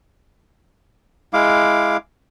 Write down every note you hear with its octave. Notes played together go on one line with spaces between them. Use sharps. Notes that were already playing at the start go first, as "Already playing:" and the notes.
G#3 E4 F5 D6